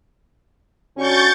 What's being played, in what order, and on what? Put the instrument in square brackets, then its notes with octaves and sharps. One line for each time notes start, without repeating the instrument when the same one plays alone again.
[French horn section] D3 C#4 F#4 [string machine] C#6 G6 A6